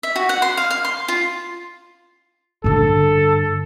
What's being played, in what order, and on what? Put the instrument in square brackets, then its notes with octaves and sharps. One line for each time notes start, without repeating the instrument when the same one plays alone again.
[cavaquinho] E5
F#4
F#5
C6
F5
F5
C6
F4
[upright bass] G2 D3 [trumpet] A4